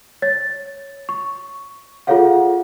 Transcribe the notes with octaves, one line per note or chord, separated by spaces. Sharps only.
C#5 A6
C#6
F4 G#4 A4 C#5 F5 F#5